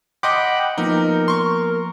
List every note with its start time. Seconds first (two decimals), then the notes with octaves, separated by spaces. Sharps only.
0.23 D#5 F#5 G5 B5 C6 D6
0.78 F3 A#3 B3 D#4 A#4
1.28 C6 C#6